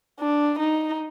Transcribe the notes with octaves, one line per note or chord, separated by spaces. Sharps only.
D4
D#4